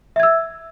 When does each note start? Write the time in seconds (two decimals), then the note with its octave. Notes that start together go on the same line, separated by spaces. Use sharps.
0.16 E5
0.20 G#6
0.23 E6